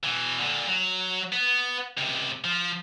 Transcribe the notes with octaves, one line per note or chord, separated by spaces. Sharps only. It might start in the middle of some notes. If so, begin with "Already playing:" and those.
B2 E3
A#2 D3
F#3
B3
C#2 C3
F3